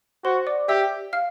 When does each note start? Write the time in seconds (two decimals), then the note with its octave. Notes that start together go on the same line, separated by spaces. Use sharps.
0.25 F#4 C5 C6
0.47 D5 D6
0.69 G4 E5 E6
1.13 F5 F6